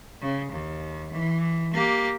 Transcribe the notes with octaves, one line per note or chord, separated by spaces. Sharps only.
C#3
D#2
E3
A#3 G4